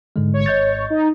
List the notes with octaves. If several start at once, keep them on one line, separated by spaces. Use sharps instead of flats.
G#2 D3 G#3
G#1 C#5
D#5 G6 A6
D#4